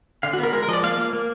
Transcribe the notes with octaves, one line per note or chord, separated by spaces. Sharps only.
D3 F5
F#4
B3 A#4
G#3 A#4
A#4
F3 D#5
D5
A#3 F5
A#3
A#3